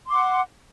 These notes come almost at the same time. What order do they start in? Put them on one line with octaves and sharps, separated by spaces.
C6 D6 F#5